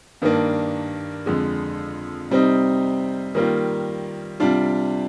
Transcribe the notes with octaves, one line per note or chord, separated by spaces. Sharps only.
G2 D#3 A#3 D4
F2 D3 G#3
C3 G3 C4 D#4
D#3 G3 A#3 F4
C3 G3 D4 F4